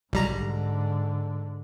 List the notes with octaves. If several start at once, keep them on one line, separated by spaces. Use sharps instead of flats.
B1 G#2 D3 G3 A#5